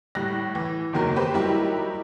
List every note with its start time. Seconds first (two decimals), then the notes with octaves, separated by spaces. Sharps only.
0.15 A2 G3 F#6 A#6
0.55 E3
0.93 F#1 E2 D#3 F#3 A#4
1.16 G4 B4 C5
1.34 F#3 G3 D#4 E4 G4 A#4